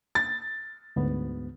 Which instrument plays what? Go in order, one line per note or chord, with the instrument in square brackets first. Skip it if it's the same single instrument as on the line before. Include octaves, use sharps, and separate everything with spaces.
[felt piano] A6
[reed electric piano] D2 G#2 B3